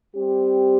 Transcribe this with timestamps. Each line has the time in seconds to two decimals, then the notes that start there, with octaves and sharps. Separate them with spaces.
0.15 G3 C4 G4